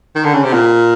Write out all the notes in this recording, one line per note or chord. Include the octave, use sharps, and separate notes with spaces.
D#3
D3
C#3
C3
A#2